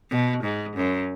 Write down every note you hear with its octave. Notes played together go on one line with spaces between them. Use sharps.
B2
G#2
F#2